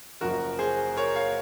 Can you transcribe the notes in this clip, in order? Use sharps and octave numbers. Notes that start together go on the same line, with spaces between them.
F#1 F#2 F3 F#4 A#4
G#4 C5
A#4 C#5
C#5 F5